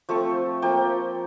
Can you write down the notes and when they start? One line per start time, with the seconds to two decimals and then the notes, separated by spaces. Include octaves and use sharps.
0.09 F3 A3 C4 C#6
0.62 F3 A#3 G5